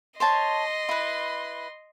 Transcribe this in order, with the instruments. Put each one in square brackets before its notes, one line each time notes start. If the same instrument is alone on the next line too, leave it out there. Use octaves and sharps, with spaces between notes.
[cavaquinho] C5 C#5 A5 [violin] D#5 C6
[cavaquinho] E4 B4